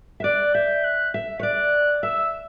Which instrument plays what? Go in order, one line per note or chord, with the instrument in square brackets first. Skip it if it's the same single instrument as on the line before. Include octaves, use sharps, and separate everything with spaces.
[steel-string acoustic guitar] E5
[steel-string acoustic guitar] D5 [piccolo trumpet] F#6
[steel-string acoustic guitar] E5 [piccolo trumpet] G6
[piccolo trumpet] F#6
[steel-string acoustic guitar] E5
C#5
[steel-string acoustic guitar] D5 [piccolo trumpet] F#6
[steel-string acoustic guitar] E5 [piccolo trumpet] E6